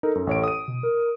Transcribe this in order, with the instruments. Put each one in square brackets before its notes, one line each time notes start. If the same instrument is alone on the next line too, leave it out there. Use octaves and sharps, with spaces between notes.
[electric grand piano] D#4 A#4 [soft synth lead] A4
[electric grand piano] F#2
A1 C#5 D7
D#6 D#7
[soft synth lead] B2
A#4